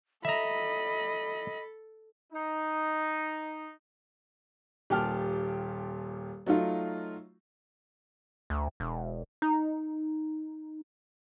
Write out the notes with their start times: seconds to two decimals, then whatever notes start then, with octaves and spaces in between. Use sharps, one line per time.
0.25 A4 D#5 E5 A#5 B5
2.33 D#4
4.90 D#1 A#2 G4 G5 A5 F6
6.46 F#3 A3 D#4 F4
8.50 D2
8.80 E1
9.42 D#4